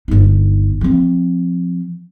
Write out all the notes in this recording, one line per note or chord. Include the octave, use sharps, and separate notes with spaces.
G1 D#4
F3 C4